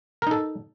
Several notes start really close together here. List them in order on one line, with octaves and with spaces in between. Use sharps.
A#4 D#4 A4